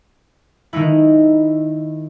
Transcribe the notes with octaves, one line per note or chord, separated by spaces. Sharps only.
D#3 G#3 D#4 E4